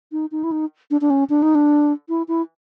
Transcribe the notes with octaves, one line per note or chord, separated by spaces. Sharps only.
D#4
D#4
E4
D#4
D4
D4
C#4
D4
D#4
D4
E4
E4